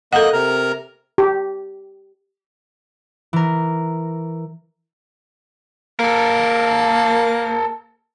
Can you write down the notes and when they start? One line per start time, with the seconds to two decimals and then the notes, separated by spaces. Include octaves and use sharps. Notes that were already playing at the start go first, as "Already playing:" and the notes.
0.13 A#3 A4 D#5 F#5 F#6
0.33 C3 A#4 A#5
1.18 G4
3.33 E3 A#4
6.00 A#3 A4 A#4